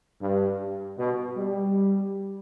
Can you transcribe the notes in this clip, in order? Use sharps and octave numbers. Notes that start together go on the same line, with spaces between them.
G2
B2
G3